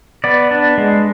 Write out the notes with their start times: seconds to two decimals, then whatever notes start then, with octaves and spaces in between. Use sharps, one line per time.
0.24 B3 D5
0.51 D4
0.78 G#3